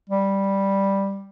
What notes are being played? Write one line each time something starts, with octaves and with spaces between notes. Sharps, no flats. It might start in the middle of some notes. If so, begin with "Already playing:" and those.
G3